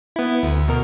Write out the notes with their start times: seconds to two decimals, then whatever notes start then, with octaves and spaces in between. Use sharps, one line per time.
0.16 B3 E4
0.43 D2
0.68 B2 A#4